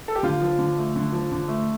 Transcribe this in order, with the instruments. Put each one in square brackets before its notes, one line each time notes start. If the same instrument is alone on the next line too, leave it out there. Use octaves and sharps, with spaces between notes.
[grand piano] A4
G4
D3 F4
F3
D3
A3
D3
F3
D3
A3